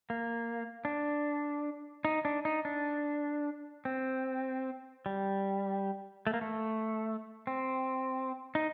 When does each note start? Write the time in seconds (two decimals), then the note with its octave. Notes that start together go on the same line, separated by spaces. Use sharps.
0.10 A#3
0.85 D4
2.05 D#4
2.25 D4
2.45 D#4
2.65 D4
3.85 C4
5.06 G3
6.27 A3
6.34 A#3
6.41 A3
7.47 C4
8.55 D#4